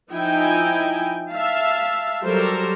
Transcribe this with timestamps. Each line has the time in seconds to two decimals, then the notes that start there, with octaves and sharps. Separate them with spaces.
0.13 F3 D#4 E4 G5 G#5
1.33 E5 F5 A5
2.24 F#3 G3 G4 A4 A#4 C5